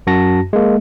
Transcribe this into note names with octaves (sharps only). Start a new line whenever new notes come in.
F#2 F#4 A5 A#6
G#3 A#3